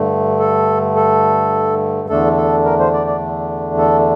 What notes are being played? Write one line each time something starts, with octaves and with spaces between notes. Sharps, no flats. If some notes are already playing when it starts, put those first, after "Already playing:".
Already playing: G2 D3 A3
A4
A4
E2 D3 A3 D4 A4
A4
A#4
C5
D5
D5
A4